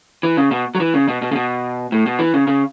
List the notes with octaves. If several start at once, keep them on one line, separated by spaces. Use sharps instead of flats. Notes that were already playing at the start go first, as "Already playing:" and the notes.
E3
C#3
B2
F#3
E3
C#3
B2
B2
C#3
B2
A2
B2
E3
C#3
C#3